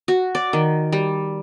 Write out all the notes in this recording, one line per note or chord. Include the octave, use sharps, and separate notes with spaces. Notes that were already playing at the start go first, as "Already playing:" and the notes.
F#4
D5
D#3
G3